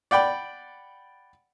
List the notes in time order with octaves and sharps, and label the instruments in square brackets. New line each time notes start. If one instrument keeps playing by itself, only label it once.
[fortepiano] D5 F#5 G5 B5